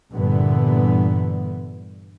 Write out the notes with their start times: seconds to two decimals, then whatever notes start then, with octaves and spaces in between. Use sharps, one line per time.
0.12 G2 A#2 D3 E3 B3